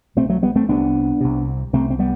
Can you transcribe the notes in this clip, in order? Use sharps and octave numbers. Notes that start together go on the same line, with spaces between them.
C2 C3 A3 C4
F#3 A3
G3 B3
A3 C4
C2 C3 B3 D4
C2 C3
C2 C3 A3 C4
C4
G3 B3